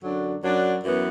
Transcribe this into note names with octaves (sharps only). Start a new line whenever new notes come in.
F#2 D3 F#3 D4
F#2 F#3 D4
F#2 E3 B3